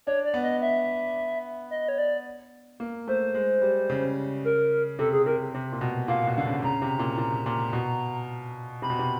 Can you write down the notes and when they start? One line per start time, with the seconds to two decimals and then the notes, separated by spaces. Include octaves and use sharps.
0.07 D4 C#5
0.25 D5
0.34 B3
0.43 D#5
0.61 E5
1.71 D#5
1.89 C#5
1.98 D5
2.80 A#3
3.07 A3 C5
3.34 G#3
3.62 G3
3.90 C#3
4.45 A#4
4.99 C3 A4
5.13 G#4
5.26 C3 A#4
5.54 C3
5.72 A#2
5.81 B2
6.08 A#2 F5
6.27 B2
6.36 D3 F5
6.46 C#3
6.63 C#3 A#5
6.82 C3
6.99 A#2
7.17 A#2
7.46 A#2
7.73 B2
8.82 C3 B5
8.90 B2
8.99 C3